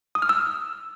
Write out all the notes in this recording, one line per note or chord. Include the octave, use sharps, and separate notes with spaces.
D#6
F6
E6